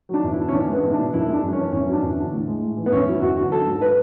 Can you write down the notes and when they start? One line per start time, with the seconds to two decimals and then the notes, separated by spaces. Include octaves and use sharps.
0.09 F#3 D4
0.24 E2
0.33 E4
0.39 D3
0.48 C#4
0.53 E2 D4
0.68 G#3 B3
0.84 E2
0.93 B2 D4
1.13 F#2 E4
1.28 G#3
1.33 D4
1.43 F#2
1.53 C#4
1.58 E3
1.73 E2 C#4
1.88 F#3
1.93 D4
2.02 E2
2.18 D3
2.33 A2
2.48 G#3
2.62 A2
2.77 E3
2.86 B3
2.92 E2 C#4
3.07 F#3 E4
3.22 E2 F#4
3.37 D3 F#4
3.52 F#3 A4
3.67 G#2
3.81 B4